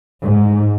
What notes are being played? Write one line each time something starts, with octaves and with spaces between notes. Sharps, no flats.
G#2